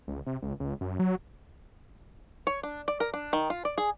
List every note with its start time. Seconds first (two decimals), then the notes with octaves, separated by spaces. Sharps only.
0.08 C#2
0.27 C3
0.43 C#2
0.60 C#2
0.81 F#2
0.99 F#3
2.47 C#5
2.63 D4
2.88 D5
3.00 A#4
3.14 D4
3.33 D#3
3.50 F4
3.65 D5
3.78 G#4